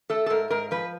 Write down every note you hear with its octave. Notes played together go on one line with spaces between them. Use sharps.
A3 A4
A4
G#2 A#4
G#2 A#4
F3 B4